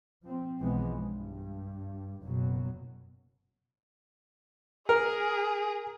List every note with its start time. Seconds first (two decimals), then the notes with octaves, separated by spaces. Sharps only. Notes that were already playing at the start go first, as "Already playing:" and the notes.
0.25 F3 C4
0.60 B1 E3 F3 G#3 B3
0.95 G2
2.25 F#1 B2 F#3
4.89 G#4 A#4